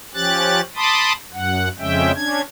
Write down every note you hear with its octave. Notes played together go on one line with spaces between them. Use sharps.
F3 C#4 G4 F#6 A6
A5 B5 C6 D6 D#6
F#2 F#5
F2 C#3 G#3 C#4 E5 G5
C#4 D4 G#6